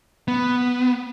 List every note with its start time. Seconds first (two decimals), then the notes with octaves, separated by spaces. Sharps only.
0.28 B3